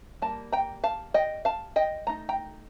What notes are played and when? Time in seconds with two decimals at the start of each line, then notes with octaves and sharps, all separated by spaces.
0.22 G3 A#3 A5
0.52 G5 A#5
0.84 F5 A5
1.14 D#5 G5
1.45 F5 A5
1.76 D#5 G5
2.07 A3 D#4 A#5
2.29 G5 A#5